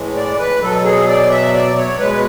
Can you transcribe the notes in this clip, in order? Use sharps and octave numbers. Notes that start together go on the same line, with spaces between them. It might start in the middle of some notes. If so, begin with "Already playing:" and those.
Already playing: A2 E3 G#3
D5
B4
B2 F#3 A4
G#4
D5
E5
D5
C#5
B2 G#3 B4